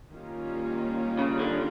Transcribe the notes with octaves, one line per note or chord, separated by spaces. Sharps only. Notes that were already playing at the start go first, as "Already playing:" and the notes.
D#3 G3 A#3 C#4 F4
C#3
D3